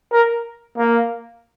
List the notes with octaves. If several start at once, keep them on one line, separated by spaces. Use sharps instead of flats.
A#4
A#3